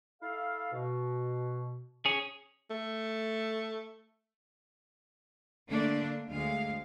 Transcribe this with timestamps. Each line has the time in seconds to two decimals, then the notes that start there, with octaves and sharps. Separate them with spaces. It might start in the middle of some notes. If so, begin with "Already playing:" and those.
0.21 E4 A4 F5
0.72 B2
2.06 C#4 G#4
2.70 A3
5.70 D3 A3 A#3 D4
6.28 D2 G#3 F5